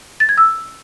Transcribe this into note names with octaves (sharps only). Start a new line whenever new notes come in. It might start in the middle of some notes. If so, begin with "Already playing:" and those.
A6
G#6
E6